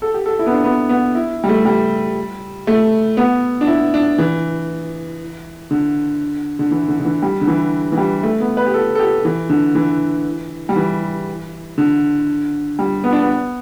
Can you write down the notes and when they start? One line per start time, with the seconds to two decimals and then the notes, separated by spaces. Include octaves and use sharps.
0.02 A4
0.14 G4
0.26 A4
0.39 E4
0.46 B3
0.52 D4
0.64 B3
0.89 B3
1.15 E4
1.44 G3
1.49 A3
1.65 G3
2.67 A3
3.17 B3
3.61 D4
3.67 E4
3.94 D4
4.18 E3
5.71 D3
6.59 D3
6.71 E3
6.88 D3
7.00 D3
7.05 E3
7.22 G3
7.41 D3
7.47 E3
7.92 E3
7.97 G3
8.23 A3
8.40 B3
8.57 B4
8.66 G4
8.74 A4
8.95 A4
8.99 G4
9.25 E3
9.50 D3
9.75 E3
10.69 G3
10.76 E3
11.78 D3
12.79 G3
13.04 B3
13.13 D4
13.22 B3